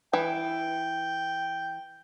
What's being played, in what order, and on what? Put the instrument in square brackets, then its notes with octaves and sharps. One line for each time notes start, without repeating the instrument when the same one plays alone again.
[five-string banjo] E3 [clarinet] G5